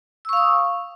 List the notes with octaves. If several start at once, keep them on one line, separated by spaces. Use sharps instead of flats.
F5 C#6 D#6 E6